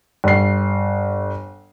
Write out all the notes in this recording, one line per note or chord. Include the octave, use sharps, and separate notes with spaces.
G1 C7